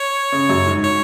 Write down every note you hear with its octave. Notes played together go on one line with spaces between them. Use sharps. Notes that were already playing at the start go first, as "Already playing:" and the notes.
Already playing: C#5
C#3
F#2
G#2
C#5